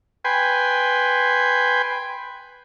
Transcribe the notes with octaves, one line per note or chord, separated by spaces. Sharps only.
B4 G5 G#5 C6